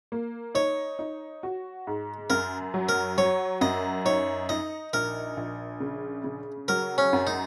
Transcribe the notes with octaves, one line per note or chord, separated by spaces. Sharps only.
A#3
D#4 C#5
D#4
F#4
G#2
F#2 A#4
F#3
A#4
F#3 C#5
F#2 D#5
D#4 C#5
D#4 D#5
A#1 A#4
A#1
C#3
C#3
F#3 A#4
C#4
F#2
D#4